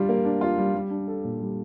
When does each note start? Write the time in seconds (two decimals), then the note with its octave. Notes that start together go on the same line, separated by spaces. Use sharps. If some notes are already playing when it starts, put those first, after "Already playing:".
Already playing: G3 D4 F4
0.09 A#3
0.25 D4
0.41 F4
0.58 G3
0.75 G3
0.91 D4
1.08 A4
1.24 A#2
1.41 G3